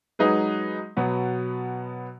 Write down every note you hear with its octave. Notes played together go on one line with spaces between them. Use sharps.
F#3 G#3 D#4 G#4 B4
B2 F#3 B3